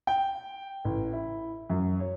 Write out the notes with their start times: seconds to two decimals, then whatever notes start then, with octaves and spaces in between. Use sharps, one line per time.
0.07 G5
0.85 A1
1.13 E4
1.70 F#2
2.00 C#5